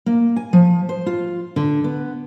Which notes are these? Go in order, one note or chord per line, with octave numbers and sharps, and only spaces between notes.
A#3
G#5
F3
C5
F4
D3
B3